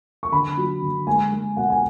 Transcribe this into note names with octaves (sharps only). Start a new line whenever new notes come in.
C#6
D3 B5
F#3
D3
G#3 G#5
G#3
B2 F#5
G#5